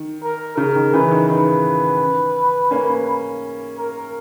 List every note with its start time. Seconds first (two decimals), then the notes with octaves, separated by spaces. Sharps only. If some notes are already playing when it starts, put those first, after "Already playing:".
Already playing: D#3
0.23 A#4
0.57 C#3 A#4
0.75 D#3
0.93 C#3 E3 B4
1.11 D#3
1.29 D#3 B4
2.71 A#3 C#4
3.78 A#4